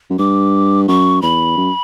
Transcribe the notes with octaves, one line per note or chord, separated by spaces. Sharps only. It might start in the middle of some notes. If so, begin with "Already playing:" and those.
F#2
G2 D6
F#2 C#6
E2 B5
F#2